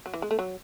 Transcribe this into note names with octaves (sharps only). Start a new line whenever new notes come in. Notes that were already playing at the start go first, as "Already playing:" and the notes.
F#3
E3
G#3
A3
F#3